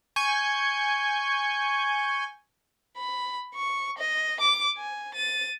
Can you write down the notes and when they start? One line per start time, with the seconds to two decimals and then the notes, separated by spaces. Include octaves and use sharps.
0.16 G#5 C#6 G6
2.97 B5
3.55 C#6
3.98 D#5
4.40 D6
4.78 G#5
5.14 A6 D#7